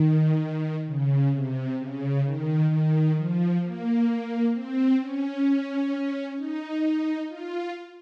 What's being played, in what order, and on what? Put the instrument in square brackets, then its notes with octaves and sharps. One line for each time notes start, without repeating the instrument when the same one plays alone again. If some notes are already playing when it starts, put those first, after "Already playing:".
Already playing: [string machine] D#3
C#3
C3
C#3
D#3
D#3
F3
A#3
C4
C#4
D#4
F4